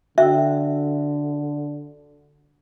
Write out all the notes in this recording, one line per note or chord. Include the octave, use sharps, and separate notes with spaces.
D3 F#4 E5 G5 E6